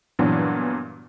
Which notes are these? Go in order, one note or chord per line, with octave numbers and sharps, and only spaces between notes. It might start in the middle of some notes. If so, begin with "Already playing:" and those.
G2 A#2 E3 F#3 B3